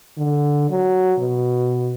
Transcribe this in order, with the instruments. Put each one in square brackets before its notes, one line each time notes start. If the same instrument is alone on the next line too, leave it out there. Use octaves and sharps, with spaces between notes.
[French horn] D3
F#3
B2